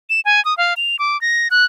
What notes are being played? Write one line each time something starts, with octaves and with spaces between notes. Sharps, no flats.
E7
G#5
D#6
F5
F7
D6
A#6
F#6